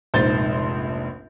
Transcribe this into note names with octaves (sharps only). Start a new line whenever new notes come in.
F1 A#1 G#2 C5 G6 A6